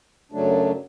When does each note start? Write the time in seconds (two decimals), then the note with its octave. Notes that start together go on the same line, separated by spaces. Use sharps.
0.32 F#2 C#3 F#3 A3 D4